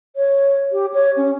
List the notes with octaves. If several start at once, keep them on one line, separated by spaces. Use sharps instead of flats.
C#5
G4
C#5
C#4